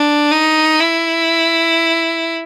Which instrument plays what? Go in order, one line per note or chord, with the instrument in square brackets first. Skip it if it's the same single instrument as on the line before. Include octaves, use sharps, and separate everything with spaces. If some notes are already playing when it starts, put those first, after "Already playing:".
Already playing: [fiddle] D4
D#4
E4